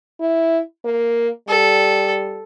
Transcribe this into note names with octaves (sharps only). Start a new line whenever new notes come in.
E4
A#3
G3 A4